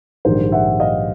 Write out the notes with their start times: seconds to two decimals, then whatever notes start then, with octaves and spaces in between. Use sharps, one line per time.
0.25 A#1 G#2 D#3 G3 A#4 C5
0.52 E5 F#5
0.80 D#5 F5